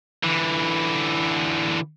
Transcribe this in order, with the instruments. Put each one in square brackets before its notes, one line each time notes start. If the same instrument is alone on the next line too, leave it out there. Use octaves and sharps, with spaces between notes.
[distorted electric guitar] D3 E3